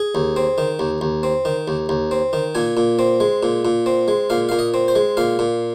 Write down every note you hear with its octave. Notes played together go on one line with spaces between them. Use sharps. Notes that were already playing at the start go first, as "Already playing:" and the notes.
Already playing: G#4
D#2
C4
D#3
D#2
D#2
C4
D#3
D#2
D#2
C4
D#3
A#2 G#5
A#2
C4
G#3
A#2
A#2
C4
G#3
A#2 F5
A#2 F5
D#5
C4
C5
G#3
A#2 F5
A#2